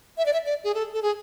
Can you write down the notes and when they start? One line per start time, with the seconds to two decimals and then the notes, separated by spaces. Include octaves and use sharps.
0.18 E5
0.26 D5
0.33 E5
0.46 D5
0.64 G#4
0.75 A4
0.93 A4
1.02 G#4